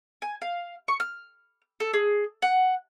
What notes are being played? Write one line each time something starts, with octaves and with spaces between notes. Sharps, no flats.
G#5
F5
C#6
F6
A4
G#4
F#5